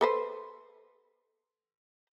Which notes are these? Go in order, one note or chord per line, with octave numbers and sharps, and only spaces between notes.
A4 B4 C5